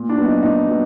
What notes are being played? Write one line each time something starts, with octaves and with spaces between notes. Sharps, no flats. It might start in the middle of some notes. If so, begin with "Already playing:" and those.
Already playing: A#2
D4
F#3 B3
D#4
A#2 D#4
F#3 B3